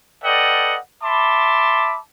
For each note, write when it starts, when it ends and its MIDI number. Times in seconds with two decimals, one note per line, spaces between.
0.23 0.77 69
0.23 0.77 71
0.23 0.77 74
0.23 0.77 75
0.23 0.77 78
0.23 0.77 79
1.03 1.97 76
1.03 1.97 81
1.03 1.97 83
1.03 1.97 84
1.03 1.97 86